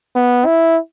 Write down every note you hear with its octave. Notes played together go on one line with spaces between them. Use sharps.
B3
E4